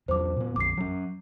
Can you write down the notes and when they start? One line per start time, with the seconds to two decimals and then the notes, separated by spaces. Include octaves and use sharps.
0.08 E2 F#3 C5 D6
0.36 A#2 B3
0.56 A#1 F2 D6 C7
0.77 F#3 C#4